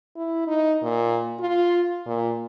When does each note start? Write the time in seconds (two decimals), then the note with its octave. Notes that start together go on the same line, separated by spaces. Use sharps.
0.16 E4
0.47 D#4
0.82 A#2
1.40 F4
2.07 A#2